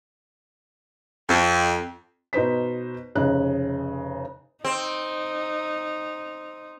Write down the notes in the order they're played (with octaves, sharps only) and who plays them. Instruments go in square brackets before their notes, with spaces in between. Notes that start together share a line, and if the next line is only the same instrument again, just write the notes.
[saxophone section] F2
[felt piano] B2 D#4 B4 C5 B6
F1 C#3 D#4 F#6
[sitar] C4 [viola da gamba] D#4